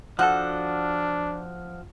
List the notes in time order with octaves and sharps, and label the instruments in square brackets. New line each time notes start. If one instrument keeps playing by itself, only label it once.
[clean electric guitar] F3 F#4 A4 [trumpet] D4 [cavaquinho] F#5